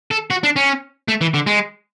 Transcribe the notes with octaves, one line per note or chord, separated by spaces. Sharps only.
A4
F#4
D4
C#4
A3
E3
D3
G#3